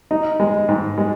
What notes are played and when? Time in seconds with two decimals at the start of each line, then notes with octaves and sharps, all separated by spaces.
0.11 D#4
0.40 G#3
0.69 G#2
0.98 G#3